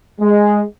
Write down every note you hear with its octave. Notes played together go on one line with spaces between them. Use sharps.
G#3